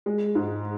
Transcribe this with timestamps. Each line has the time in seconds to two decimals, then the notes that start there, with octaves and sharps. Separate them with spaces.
0.06 G#3
0.35 G#2